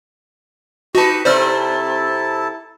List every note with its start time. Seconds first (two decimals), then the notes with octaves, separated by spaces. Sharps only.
0.95 D#4 F#4 G4 B4 A5
1.25 C3 C4 E4 A4 C5 D5 A5 F6